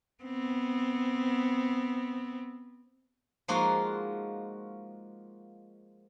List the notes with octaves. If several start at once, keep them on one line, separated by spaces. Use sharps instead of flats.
B3 C4
F3 G#3 A#3 D#4 F4 F#4